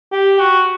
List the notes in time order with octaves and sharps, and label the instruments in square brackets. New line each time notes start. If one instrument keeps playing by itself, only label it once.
[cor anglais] G4
F#4